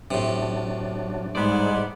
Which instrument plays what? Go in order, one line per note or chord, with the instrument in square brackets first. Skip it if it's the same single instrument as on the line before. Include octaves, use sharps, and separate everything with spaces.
[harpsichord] A2 C3 [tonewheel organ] F#3 D4
[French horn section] G#2 [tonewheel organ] G3 G#4 [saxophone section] B3 C5 D5